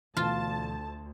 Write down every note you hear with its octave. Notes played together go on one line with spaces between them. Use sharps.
D2 B2 E3 F4 A5